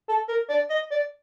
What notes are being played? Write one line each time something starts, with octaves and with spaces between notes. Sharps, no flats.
A4
A#4
D5
D#5
D5